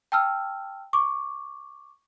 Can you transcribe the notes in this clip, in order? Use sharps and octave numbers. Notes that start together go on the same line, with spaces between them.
G5 A5 E6 F6
C#6 D6